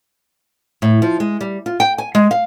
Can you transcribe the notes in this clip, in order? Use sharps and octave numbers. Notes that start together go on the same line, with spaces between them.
A2
F3
G#3
G3
F4
G5
G#5
G#3
F5